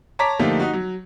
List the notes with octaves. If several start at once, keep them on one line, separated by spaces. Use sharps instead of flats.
C#5 A5 A#5 D6 B6
D3 F3 A3 A#3 D#4 G4
D#4 F#4
F#3